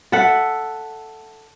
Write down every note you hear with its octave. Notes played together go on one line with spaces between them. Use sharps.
A4 E5 F#5